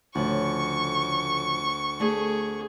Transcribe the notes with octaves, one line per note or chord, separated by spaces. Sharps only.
D2 A2 C#3 F3 C#6
A3 G#4 A4 D5